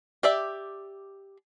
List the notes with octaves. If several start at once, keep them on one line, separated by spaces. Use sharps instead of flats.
G4 D5 E5